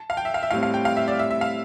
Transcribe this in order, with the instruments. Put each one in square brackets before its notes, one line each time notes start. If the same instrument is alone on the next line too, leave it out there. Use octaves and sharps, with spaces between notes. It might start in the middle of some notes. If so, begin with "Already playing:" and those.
Already playing: [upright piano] A5
F5
G5
E5
F5
E5
[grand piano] A2 G3 C4 [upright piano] F5
[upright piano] F5
G5
F5
E5
D5
E5
E5
F5